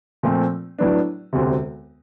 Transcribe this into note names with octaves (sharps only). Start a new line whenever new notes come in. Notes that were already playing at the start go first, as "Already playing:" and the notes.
A#2 F3 A3 C4
A2 F#3 B3 D4
E1 D2 C3